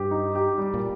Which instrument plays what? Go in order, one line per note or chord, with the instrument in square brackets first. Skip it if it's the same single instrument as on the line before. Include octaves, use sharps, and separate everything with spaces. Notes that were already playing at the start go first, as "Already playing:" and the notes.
Already playing: [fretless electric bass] G2 [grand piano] G4
[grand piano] D#4
G4
G3
[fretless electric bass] A#2